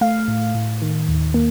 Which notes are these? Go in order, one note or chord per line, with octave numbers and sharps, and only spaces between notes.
A3 F5
A2
A2
D#3
D#2
A#3